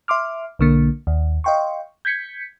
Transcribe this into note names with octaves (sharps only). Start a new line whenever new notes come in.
E5 C6 D6 F6
B1 D3 A#3
D#2
D#5 F5 G5 C6 C#6
G6 G#6 B6 C#7